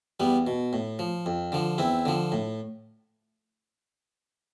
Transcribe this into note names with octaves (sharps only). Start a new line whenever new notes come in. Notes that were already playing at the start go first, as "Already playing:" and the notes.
E2 G3 B3
B2
A2
F3
F2
D3 F3
E2 C4 E4
D3 F3
A2